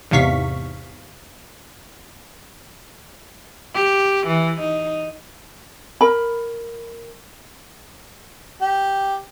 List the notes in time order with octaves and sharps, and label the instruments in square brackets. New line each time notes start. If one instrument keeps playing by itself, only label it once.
[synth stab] E2 G#2 C3 F5 C#6 B6
[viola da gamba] G4
E3
D#4
[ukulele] A#4 B5
[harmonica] G4